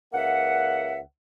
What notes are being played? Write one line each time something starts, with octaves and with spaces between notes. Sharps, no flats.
C#2 A#3 E5 F#5